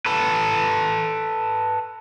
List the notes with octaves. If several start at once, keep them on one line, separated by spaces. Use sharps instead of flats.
A4 B4